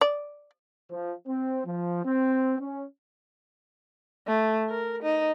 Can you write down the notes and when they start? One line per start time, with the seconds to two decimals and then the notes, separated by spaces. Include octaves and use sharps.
0.01 D5
0.90 F3
1.27 C4
1.65 F3
2.05 C4
2.59 C#4
4.27 A3
4.70 A#4
5.02 D#4